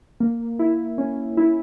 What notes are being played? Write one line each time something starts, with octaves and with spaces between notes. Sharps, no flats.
A#3
E4
C#4
E4